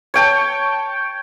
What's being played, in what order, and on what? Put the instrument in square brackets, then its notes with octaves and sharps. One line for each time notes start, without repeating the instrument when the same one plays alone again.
[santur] C#5 G5 A5